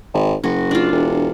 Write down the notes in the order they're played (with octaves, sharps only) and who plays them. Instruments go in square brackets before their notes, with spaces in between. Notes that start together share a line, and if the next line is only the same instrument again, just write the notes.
[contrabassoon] G#1
[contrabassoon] F#1 [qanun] F#4
[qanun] D4 F4
[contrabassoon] E1